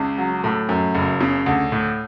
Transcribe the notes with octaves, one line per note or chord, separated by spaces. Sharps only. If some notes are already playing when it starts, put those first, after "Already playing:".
Already playing: C#2 C#3
F#3
A2
F#2
F#1
C#3
D2
A2